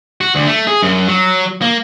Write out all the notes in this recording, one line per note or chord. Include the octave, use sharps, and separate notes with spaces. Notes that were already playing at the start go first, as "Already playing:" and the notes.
F#4
D2
A3
G#4
F#2
F#3
A#3